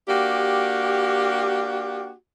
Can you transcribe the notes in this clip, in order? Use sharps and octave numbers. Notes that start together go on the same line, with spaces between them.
A#3 D4 F#4 G4